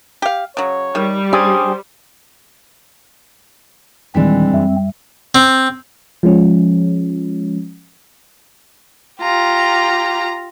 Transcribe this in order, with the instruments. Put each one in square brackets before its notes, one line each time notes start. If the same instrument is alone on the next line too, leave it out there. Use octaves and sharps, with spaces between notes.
[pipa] G4 F5
[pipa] C#3 F#3 [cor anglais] C#5
[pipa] D#3 [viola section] G3
[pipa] C#4 [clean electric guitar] D4 G4 G#4 [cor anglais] C5
[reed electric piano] D#2 A#2 D#3 [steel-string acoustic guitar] E3 G#3 D4 [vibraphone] G3 [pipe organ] C4
[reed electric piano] F#2 E5
[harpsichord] C4
[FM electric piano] F3 G#3 C#4
[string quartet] F4 G4 A#5